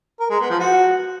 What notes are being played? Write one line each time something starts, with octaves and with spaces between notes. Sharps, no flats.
A#4
G#3
B3
F3
F#4